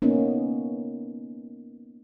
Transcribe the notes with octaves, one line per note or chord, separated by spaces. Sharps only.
A#3 B3 C#4 D#4